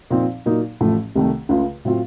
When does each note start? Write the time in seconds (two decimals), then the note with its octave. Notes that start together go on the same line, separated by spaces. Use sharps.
0.10 A#2 F3 C4 D#4
0.46 A#2 F#3 A#3 D#4
0.81 A1 A2 F3 A3
1.15 C2 C3 D#3 A3
1.49 C#2 C#3 A3 C#4 F4
1.85 A2 F#3 C4 F4